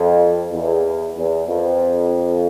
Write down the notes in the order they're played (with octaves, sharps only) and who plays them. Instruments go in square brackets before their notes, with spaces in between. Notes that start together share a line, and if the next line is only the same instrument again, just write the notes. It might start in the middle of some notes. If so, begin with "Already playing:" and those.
Already playing: [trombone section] F2
E2
E2
F2